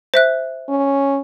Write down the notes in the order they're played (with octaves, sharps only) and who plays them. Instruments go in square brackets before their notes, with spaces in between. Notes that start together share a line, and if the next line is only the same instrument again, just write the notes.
[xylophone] C5 E5 F#6
[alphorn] C#4